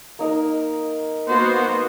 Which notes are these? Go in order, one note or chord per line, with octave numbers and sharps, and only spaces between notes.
A#3 D#4 A#4
A#3 B3 F#4 C5